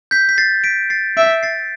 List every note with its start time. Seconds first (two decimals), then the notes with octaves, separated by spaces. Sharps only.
0.11 G6 B6
0.29 B6
0.38 A6 C7
0.64 B6 D7
0.90 A6 C7
1.17 E5 B6 D7
1.43 A6 C7